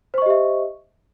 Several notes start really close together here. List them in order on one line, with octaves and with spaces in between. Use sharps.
C5 C#6 D#5 G4 E5